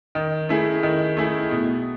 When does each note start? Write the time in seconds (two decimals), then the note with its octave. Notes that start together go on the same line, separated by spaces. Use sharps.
0.15 D#3
0.49 A3 E4 G#4
0.83 D#3
1.17 A3 E4 G#4
1.51 B2